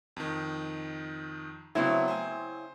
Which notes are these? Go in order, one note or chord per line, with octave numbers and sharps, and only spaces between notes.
F2 D#3
C#3 F#3 A3 B3 C4 E4
C5 G#5